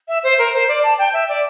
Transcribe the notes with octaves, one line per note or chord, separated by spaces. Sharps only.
E5
C5
A#4
C5
D5
A5
G5
E5
D5